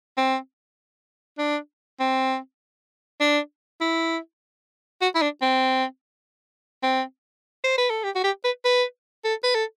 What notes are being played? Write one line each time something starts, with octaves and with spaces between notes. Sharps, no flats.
C4
D4
C4
D4
E4
F#4
E4
D4
C4
C4
C5
B4
A4
G4
F#4
G4
B4
B4
A4
B4
A4